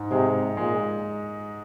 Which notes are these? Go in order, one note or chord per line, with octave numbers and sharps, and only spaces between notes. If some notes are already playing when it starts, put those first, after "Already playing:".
Already playing: G#2
C3 G#3
A#2 G#3